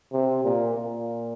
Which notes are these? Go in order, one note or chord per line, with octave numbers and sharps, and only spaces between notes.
C3
A#2
A#2